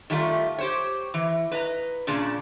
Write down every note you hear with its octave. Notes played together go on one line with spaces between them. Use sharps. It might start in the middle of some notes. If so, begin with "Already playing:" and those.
D#3 G3 A3 F4
G4 C5 C#5
E3
B4 D#5 A#5
A#2 C#3 D4